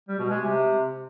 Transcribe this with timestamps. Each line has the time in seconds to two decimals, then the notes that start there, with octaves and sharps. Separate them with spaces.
0.08 G3
0.19 B2
0.30 G#3
0.40 C3